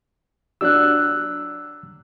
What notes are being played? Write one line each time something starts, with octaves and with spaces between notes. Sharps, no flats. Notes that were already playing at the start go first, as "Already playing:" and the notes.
F#3 D4 G4 E6 F#6